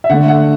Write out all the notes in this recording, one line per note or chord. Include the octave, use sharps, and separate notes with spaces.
E5
D3 A3 F#5
F#5